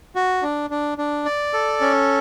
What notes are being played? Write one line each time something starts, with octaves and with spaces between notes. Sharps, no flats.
F#4
D4
D4
D4
D5
A4
C#4